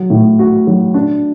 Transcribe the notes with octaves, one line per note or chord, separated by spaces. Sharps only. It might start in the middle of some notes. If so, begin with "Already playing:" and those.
Already playing: F#3
A2
F#4
F#3
D4